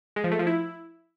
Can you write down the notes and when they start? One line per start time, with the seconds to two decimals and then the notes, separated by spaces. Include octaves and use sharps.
0.16 G#3
0.24 F3
0.32 A3
0.39 F3
0.47 E4